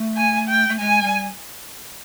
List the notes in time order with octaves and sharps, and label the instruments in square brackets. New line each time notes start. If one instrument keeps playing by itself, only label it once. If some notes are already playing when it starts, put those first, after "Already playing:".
Already playing: [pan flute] A3
[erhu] G#5
G5
[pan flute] A3
[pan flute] G#3 [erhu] G#5
[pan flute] G3